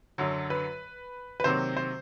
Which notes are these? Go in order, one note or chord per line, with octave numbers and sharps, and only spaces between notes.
F#2 D3 F#3
B4
B4
C3 D#3 F#3 A#3 C5
C5